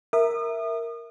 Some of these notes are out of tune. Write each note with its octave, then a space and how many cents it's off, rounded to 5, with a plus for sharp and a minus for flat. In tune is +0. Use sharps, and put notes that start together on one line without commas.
A#4 +0 E5 +0 D#6 -35